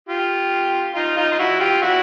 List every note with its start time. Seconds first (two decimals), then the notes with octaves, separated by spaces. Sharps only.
0.09 F4 G4
0.95 D#4 F4
1.17 D#4 F4
1.32 F4
1.39 E4 F#4
1.60 F4 G4
1.82 E4 F#4